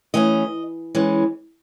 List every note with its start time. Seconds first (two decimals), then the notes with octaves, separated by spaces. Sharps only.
0.14 E3 A3 C#4 D#5
0.95 E3 G#3 C#4